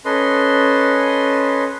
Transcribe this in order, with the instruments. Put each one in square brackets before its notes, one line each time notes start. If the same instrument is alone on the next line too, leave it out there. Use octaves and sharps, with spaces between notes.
[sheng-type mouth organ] C#4 A4 B4 D#5 C6